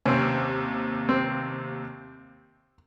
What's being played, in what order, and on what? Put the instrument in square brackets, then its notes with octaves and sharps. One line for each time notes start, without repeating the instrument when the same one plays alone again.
[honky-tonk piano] D#2 C3 [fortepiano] C4 C#4
[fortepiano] C4